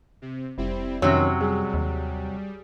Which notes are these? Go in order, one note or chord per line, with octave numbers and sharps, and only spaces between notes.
C3
F1 G3 C4 E4
F2 C3 D#3 F#3 C#4 C#5
G3 G#4
D#2